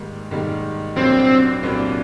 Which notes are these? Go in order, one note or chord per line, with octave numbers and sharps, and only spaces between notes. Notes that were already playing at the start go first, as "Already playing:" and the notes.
Already playing: G#2 D#3 G3 A#3
G#2 D#3 G3 A#3
C2 A#2 F#3 A#3 C4 D4
C2 A#2 F#3 A#3 D4